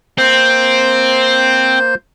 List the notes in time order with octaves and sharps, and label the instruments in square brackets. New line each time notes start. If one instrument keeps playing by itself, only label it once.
[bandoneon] A#3 C5 G6 [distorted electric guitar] C4